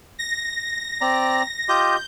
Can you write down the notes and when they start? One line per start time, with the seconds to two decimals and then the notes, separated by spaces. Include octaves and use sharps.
0.19 A#6
1.01 C4 D5 A#5
1.69 F4 G4 D#5 G6